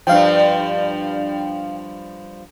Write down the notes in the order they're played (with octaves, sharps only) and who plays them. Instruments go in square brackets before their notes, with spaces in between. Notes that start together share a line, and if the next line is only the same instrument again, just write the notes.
[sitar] G2 F3 [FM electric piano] F5 G5